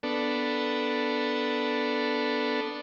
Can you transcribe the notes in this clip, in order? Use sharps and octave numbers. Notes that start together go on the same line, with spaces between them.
B3 D4 A4